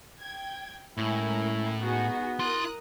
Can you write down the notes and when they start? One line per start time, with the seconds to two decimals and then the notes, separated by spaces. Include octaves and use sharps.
0.20 G5 G#6
0.97 A2 G#3 C#4 E4 A#4
1.79 B3 D#4 F#4 G#4
2.40 E4 A#4 C6 D#6 F#6